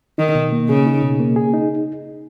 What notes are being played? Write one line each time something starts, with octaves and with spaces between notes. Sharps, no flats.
D#3 D#4
B2
A#3
C#3 G#4
D#4
B2
A#3
G#4
D#4